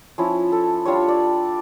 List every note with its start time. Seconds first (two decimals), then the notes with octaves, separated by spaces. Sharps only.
0.18 F3 C#4 E4
0.52 A4
0.85 G3 D4 F4 C#5
1.08 D5